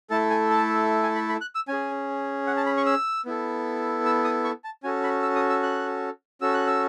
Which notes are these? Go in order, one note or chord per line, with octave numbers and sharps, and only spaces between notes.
A3 E4 A4 A5
G#5
A5
G#5
B5
B5
F#6
E6
C#4 G#4 G#5
F#5
A5
B5
C#6
E6
B3 E4 A4
E6
D#6
C#6
A5
C#4 F#4 A4 G#5
B5
E6
D#6
E6
F#6
C#4 F#4 A4 E6
F#6
E6